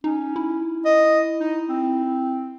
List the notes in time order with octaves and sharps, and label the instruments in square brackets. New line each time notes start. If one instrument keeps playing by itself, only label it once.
[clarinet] C#4 [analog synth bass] D#4
[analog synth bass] E4
[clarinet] D#5
D#4
C4